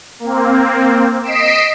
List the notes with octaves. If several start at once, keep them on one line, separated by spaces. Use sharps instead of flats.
A#3 C4
D#5 B6 C7 D7 E7